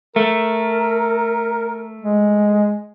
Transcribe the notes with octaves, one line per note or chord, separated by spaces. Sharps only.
A3 A#4
G#3